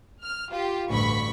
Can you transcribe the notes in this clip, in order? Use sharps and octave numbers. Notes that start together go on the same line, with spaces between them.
F6
F4 G4
A1 D2 G2 B5 C#6 B6